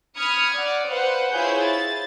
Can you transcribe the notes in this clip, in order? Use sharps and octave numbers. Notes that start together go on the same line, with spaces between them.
B5 D#6 F6 G#6 C#7
D5 F#5
B4 C5 F5 F#5
E4 F4 G#4 C5 C#5 G6
A6